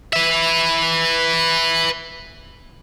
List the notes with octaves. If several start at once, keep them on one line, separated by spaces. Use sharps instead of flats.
B4 E5